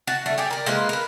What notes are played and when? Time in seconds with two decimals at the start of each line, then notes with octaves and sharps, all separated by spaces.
0.07 F#4 A5
0.26 G3 A3 D4
0.38 G4 G#4 D5
0.51 A#4 D5
0.66 G#3 A#3 F4 B4
0.89 A#4 B4